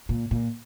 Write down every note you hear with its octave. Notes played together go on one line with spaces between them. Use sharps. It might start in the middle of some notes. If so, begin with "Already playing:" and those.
A#2
A#2